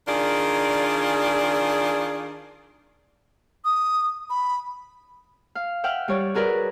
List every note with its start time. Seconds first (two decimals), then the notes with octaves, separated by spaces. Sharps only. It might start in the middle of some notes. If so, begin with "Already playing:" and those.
0.08 D#3 D4 F4 G#4 D5
3.65 D#6
4.30 B5
5.55 F5
5.84 E5 F#5 G5 F6
6.08 G3 C#5 D5
6.34 F#4 G#4 A#4 B4 D5